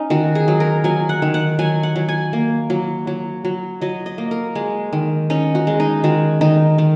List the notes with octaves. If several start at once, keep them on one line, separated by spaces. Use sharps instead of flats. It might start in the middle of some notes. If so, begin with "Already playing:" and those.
Already playing: C#4 D#4
D#3 F#4
G#4
F#3
A#4
F#3 G#5
F#5
D#3
F#5
F#3 G#5
F#5
F#3
G#5
A#3
F#3
F#3
F#3
F#3 D#5
D#5
A#3
A#4
G#3
D#3
C#4 D#4
F#4
G#3
D#4
D#3 F#4
D#3 D#4
D#3